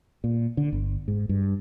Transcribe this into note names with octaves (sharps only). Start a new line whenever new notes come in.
A#2
D3
G1
G#2
G2